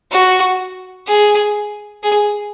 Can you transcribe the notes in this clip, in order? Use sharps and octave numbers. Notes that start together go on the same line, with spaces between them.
F#4
G#4
G#4